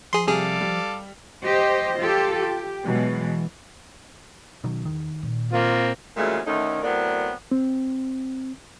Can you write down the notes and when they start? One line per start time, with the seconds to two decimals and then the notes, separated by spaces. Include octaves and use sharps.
0.13 F3 G#4 C6
0.27 C3 G3 G#4 A4 D5 F5
0.61 G3
1.43 G4 C5 D#5
1.99 F4 G4 A4
2.36 G4
2.84 B2 E3 F#3 G#3
4.64 B2 D#3 F#3
4.85 E2 D#3
5.23 A#2
5.52 A#3 C4 F4
6.17 A#2 C#3 E3 F#3 G#3 A3
6.46 D2 D3 D#3 A3 C#4 D#4
6.83 A2 F#3 B3 C4 A#4 D5
7.51 C4